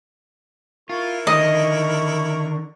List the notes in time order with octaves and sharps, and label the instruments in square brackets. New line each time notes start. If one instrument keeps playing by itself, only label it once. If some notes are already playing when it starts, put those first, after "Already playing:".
[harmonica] E4 A#4 C#6 [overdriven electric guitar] F4
[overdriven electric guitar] D3 D#3 [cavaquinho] D#5